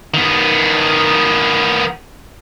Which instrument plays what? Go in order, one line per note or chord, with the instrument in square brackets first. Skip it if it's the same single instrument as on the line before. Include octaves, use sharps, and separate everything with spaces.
[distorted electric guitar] D#3 B3